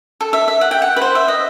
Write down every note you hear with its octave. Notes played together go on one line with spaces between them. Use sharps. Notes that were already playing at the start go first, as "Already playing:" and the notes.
A4
E5
E5
F#5
G5
F#5
B4
C5
E5
D#5